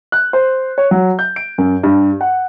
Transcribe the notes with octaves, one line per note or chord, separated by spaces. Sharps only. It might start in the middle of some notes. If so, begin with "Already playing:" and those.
F#6
C5
C#5
F#3
G6
D7
F#2
G2
F#5